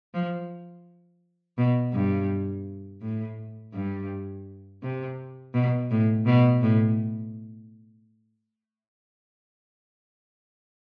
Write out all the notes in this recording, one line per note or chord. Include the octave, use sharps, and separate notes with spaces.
F3
B2
G2
A2
G2
C3
B2
A2
B2
A2